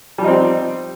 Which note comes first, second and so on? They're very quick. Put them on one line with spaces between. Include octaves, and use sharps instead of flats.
G3 F3 D#4 C4